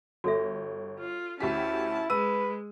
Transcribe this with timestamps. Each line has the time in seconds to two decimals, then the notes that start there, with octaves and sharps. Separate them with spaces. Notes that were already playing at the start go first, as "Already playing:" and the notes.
0.24 G1 F#4 A4 E5
0.99 F4
1.40 D2 C#4 E4 G4 A5 B6
2.10 G#3 B4 E6 D#7